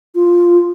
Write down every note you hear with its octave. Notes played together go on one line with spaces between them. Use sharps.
F4